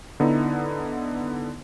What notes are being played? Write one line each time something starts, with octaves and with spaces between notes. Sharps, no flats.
D3 B3 D#4 E4